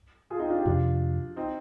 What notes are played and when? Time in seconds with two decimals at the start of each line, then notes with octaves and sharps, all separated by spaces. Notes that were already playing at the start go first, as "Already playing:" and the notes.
0.30 F4 G#4
0.39 C4 D#4
0.48 D4 F4
0.57 D#4 G4
0.66 F2 C3 F3 D4 F4
1.36 C4 D#4